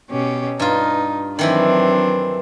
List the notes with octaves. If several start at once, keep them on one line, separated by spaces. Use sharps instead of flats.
B2 C#4 G4
G2 D#4 F4
D#3 E3 F#3 C4 D4 E4